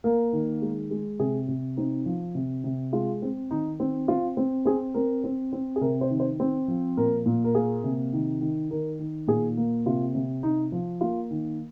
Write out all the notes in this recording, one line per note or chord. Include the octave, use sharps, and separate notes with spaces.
A#3 A#4
D#3
G#3
G#3
C3 G#4
C3
C4 D#4
F3
C3
C3
G#3 F4
C4
D#3 D#4
C4
C4 F4
C4
C4 G#4
C4 A#4
C4
C4
G#4
C3 A#4
C5
D#3
C5
C4
F3
A#2 A#4
A#2
A#4
A#3 G#4
C3
D#3
D#3
D#3 A#4
D#3
A#2 G#4
A#3
C3 F4
C3
C3 D#4
F3
A#3 F4
D#3